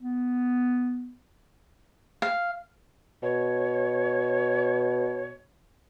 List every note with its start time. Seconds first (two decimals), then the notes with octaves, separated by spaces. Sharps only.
0.03 B3
2.22 F5
3.23 B2 C#5